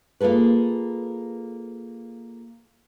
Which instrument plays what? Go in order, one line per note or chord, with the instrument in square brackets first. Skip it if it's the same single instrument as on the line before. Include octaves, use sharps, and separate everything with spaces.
[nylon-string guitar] A#3 F4 G#4 A4 B4